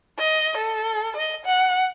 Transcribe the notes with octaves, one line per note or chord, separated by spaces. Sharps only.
D#5
A4
D#5
F#5